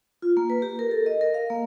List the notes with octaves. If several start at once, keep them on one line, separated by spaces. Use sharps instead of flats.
F4
A#3
B4
G4
A#4
A4
D#5
A#4
F5
A#3